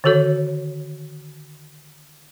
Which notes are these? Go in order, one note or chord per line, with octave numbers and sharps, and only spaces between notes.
D3 D#3 F#4 A4 C#5